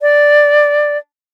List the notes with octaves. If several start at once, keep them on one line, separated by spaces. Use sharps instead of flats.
D5